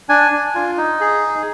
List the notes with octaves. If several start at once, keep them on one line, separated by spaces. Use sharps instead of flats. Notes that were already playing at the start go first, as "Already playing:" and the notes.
D4 G#5
D4
F4
D#4
G#4